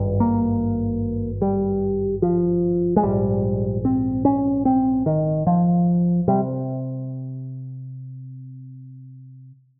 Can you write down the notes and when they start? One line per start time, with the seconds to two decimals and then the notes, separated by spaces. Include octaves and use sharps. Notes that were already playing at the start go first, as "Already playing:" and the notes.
Already playing: G#1 G2
0.20 A#3
1.42 G3
2.22 F3
2.96 G#3
3.03 A#1 G#2 G3
3.85 C4
4.25 C#4
4.65 C4
5.06 D#3
5.47 F3
6.28 C3 G3